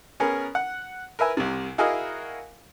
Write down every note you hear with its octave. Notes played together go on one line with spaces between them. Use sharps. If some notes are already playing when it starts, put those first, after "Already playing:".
B3 C#4 G#4 A#4
F#5
A#4 B4 E5 G#5
C2 C3
E4 F#4 G#4 A#4 D#5 F5